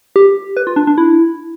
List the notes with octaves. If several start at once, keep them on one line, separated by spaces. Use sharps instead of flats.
G4
B4
F4
D4
D4
E4